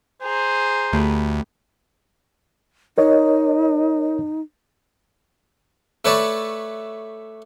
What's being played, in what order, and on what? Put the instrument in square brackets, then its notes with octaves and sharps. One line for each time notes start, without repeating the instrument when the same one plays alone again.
[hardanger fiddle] G#4 A#5 [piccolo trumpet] C5
[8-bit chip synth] D2 [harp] A3 G4 B4
[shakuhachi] D#4 [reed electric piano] A#4 C#5 D#5
[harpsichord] A3 B4 C#5 D5 A5